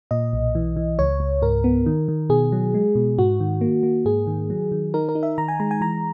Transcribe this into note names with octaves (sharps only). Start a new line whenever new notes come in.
A#2 D#5
B1
E3
E3
C#2 C#5
C#2
G#2 A#4
B3
D#3
D#3
B2 G#4
F#3
G#3
B2
G#2 F#4
D#3
A#3
A#3
G#2 G#4
D#3
F#3
D#3
D#4 A#4
A#4
D#4
E5
D#3 A#5
G#5
G#3 A#5
G#5
E3 A#5